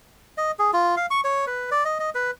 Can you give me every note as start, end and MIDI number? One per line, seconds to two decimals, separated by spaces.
0.38 0.51 75
0.59 0.71 68
0.73 0.95 65
0.97 1.06 77
1.11 1.21 85
1.24 1.45 73
1.47 1.70 71
1.71 1.84 74
1.85 1.99 75
2.00 2.10 75
2.15 2.31 71